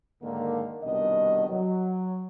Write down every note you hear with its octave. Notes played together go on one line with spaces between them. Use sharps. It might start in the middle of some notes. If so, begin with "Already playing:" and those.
G#2 D3 D#3 A#3
C2 B2 D#3 B3 D4 D#5
F#3